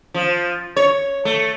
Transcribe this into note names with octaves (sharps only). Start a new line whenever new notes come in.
F3
C#5
A3